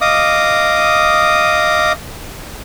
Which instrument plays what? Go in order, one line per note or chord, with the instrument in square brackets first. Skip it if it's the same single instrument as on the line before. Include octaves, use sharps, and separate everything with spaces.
[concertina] D#5 F5 D6 D#6